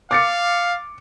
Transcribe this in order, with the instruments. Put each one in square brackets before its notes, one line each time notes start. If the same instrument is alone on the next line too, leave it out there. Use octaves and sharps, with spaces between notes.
[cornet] F5 [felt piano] D6 A6 C#7